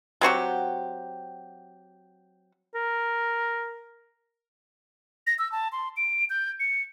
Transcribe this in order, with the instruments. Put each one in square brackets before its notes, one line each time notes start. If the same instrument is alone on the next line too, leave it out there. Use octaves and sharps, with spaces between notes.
[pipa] F#3 C4 F#4 G4
[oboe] A#4
[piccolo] A#6
E6
A5
C6
D7
G6
C#7